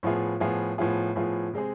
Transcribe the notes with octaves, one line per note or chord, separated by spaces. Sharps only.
A2 F3 B3 F4 G#4
A2 F3 B3 F4 G#4
A2 F3 B3 F4 G#4
A2 F3 B3 F4 G#4
C3 G#3 C4 G#4